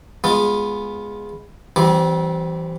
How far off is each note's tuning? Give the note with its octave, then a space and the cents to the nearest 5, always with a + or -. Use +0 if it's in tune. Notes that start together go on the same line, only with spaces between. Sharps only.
G#3 -5 B3 +0 F4 +15
E3 +5 G3 -35 C4 +0